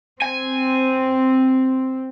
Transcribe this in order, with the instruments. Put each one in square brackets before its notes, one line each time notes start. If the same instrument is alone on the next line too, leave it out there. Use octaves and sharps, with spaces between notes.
[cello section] C4 [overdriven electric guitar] G#5